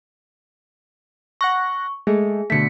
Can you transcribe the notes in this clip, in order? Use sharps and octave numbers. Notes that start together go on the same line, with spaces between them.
F#5 C#6 F#6 A#6
G#3 A3 G#4
B2 D3 A3 B6 C#7